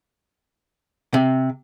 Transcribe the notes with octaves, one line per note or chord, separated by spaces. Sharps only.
C3